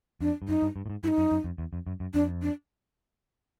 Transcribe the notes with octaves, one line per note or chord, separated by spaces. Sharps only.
F2 D4
G2
F#2 D#4
G2
G2
A2
G#2
G2 E4
D#4
F#2
F#2
F2
E2
F2
F#2
F#2
F2 D4
D4